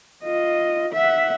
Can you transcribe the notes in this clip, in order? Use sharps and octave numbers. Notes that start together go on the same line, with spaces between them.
F4 D#5
E5 F#5